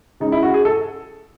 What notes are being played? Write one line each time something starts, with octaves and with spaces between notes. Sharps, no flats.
C#3 G#3 D#4
E4
F#4
G#4
A4